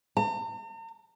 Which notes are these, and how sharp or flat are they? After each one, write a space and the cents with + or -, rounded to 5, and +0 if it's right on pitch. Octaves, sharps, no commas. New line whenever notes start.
A#5 -45